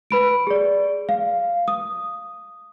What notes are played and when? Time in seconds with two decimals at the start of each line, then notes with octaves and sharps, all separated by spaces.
0.11 B4 B5 D7
0.47 G#4 D5
1.09 F5
1.68 D#6